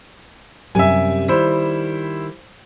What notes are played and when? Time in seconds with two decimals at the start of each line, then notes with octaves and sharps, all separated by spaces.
0.75 F#2 C3 G3 E5 G#5
1.28 D#3 G3 E4 C5